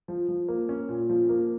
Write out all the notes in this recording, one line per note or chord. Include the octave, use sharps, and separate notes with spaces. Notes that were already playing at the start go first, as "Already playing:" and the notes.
F3
F3
A#3
C#4
A#2
F3
A#3